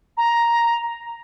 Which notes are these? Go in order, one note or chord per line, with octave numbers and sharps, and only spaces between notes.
A#5